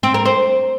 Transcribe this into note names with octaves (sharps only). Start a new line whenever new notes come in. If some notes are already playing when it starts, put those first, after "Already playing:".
C4
A#4
C5